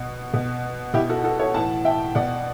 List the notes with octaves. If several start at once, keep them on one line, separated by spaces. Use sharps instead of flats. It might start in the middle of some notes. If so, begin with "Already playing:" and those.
Already playing: B2
B2
B2 E4 G4
F#4 A4
F#4 A4
A4 C#5
A2 E3 F#5 A5
E5 G5
B2 D5 F#5